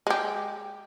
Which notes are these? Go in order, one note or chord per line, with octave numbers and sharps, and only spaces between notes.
G#3 G4